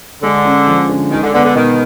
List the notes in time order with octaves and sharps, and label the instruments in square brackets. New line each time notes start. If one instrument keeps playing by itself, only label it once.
[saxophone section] D3 [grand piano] G#3
[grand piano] C#4
F3
D3
[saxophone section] D#3 [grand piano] G#3
[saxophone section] D3
[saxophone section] D3 [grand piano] B3
[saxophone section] D3
[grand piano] B2 [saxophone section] D#3